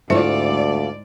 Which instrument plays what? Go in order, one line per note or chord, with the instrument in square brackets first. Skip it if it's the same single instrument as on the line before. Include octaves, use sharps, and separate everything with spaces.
[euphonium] D2 [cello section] G#2 D5 [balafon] E4 C5 E5 [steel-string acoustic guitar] F4 A4